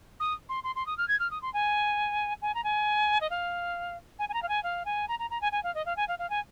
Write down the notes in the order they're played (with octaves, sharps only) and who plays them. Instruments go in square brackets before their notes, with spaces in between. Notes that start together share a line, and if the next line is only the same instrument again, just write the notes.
[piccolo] D#6
C6
C6
C6
D#6
F6
G#6
F6
D#6
C6
G#5
G#5
A#5
G#5
D#5
F5
G#5
G#5
A#5
F5
G#5
F5
G#5
A#5
A#5
A#5
G#5
G#5
F5
D#5
F5
G#5
F5
F5
G#5